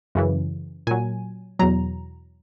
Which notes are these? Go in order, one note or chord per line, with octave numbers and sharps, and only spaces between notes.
F#2 C#3 E3
A#2 F#3 G#5
E2 B2 F#3 A#5